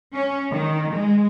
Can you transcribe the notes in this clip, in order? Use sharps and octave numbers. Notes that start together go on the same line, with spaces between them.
C#4
D#3
G#3